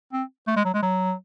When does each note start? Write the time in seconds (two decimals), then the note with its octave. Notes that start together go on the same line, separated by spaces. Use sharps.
0.13 C4
0.48 A3
0.56 G#3
0.65 F#3
0.74 G#3
0.83 F#3